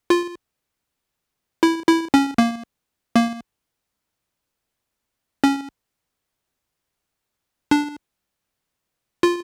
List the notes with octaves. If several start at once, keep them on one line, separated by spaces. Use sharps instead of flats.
F4
E4
E4
C#4
A#3
A#3
C#4
D4
F4